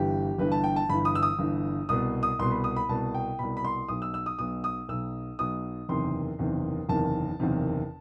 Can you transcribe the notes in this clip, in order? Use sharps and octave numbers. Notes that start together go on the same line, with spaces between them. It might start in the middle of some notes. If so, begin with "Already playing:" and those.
Already playing: G1 G2 E3 G4
G1 G2 E3 B4
A5
G5
A5
G1 G2 E3 B5
D#6
E6
D#6
G1 G2 E3
C2 B2 D#6
D#6
C2 B2 C6
B5
D#6
B5
C2 B2 A5
G5
C2 B2 B5
B5
C6
B1 B2 D#6
E6
E6
D#6
B1 B2 D#6
D#6
B1 B2 E6
B1 B2 D#6
F#1 E2 C3 D#3 C6
F#1 E2 C3 D#3
F#1 E2 C3 D#3 A5
F#1 E2 C3 D#3